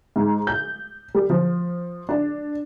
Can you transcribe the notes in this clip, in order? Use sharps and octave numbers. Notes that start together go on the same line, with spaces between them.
G#2
G6
G3
F3
D4